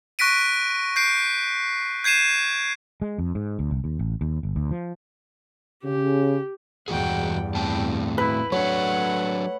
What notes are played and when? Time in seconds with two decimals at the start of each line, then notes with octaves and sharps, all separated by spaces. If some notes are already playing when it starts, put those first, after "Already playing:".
0.19 C#6 F#6 A#6 B6 D7 D#7
0.96 G6 C7 D7
2.04 G6 G#6 C7 D#7 E7
3.02 G#3
3.18 F2
3.35 G#2
3.59 D2
3.71 C2
3.84 D#2
3.99 A1
4.21 D#2
4.43 G1
4.56 D2
4.71 F3
5.84 C#3 G4
6.88 E2 G2 E3 F#4 G#4 F#5 G5
7.55 A2 C4 G5 A5
8.18 E4 B4
8.52 F#3 A3 D4 C#5 F#5